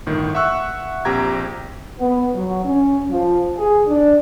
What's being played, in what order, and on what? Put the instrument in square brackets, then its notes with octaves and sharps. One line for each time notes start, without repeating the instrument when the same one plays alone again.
[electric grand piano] G1 A2 D#3
E5 F#5 C#6 E6 F#6
A#1 C4 G4 A#5 G#6
[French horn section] B3
F#3
C#4
F3
G#4
D4